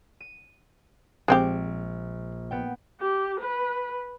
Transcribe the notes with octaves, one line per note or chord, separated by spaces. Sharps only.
D#7
A#1 G#3 C4 G4 D7
B3 G5
G4
B4